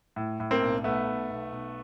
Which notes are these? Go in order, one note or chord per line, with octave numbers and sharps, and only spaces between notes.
A2
A2
A#3 C4
B1
B1 A3 B3
B1
B1
B1